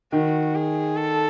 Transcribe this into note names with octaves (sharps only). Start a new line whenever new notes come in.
D#3 F#4
G#4
A4